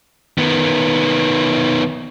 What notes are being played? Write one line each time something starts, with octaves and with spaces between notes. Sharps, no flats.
D#3 B3